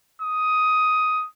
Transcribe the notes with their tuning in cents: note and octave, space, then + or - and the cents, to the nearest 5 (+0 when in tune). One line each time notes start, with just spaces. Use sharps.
D#6 +10